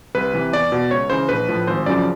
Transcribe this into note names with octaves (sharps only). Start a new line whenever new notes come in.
C2 B4
C3 E3
E2 D5
B2
C#2 C#5
C#3 E3 C5
A#1 B4
A2 F3
G#1 C5
F#2 C#3 F3 D5